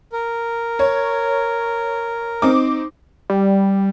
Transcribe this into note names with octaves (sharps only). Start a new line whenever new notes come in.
A#4
C#5
C4 D#4 D6
G3